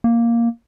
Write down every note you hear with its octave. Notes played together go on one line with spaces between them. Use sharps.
A#3